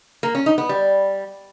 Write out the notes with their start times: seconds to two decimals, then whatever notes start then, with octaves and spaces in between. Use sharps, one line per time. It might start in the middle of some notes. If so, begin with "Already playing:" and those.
0.23 A#3
0.35 C#4
0.46 D#4
0.58 B3
0.69 G3